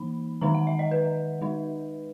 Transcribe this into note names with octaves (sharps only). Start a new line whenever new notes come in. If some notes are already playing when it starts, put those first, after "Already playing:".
Already playing: E3 A#3 D#4 B5
D#3 G#3 D#4 A#5
F#5
E5
D#5
B4
G#3 D#4